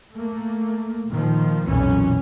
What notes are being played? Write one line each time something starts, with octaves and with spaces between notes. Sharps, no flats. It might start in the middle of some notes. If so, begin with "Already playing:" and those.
A3 A#3
A#2 D#3 F3
B1 F2 A#2 E3 C#4